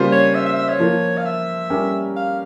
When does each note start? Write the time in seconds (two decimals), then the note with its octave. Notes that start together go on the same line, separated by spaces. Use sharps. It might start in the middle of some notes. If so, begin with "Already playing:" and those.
Already playing: C#3 G3 A#3 F4 C5
0.12 C#5
0.35 E5
0.46 E5
0.56 E5
0.69 C#5
0.79 F3 A#3 F4
1.17 F5
1.25 E5
1.70 G3 C#4 G4 A#4
2.16 F5